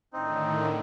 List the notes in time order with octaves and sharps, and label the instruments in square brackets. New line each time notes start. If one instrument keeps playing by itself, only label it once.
[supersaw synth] A2 D3 D#3 [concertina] C4 D#4